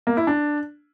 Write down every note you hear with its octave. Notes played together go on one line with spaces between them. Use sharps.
A#3
E4
D4